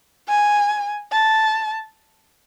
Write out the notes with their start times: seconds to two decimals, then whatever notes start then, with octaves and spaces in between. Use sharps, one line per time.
0.28 G#5
1.12 A5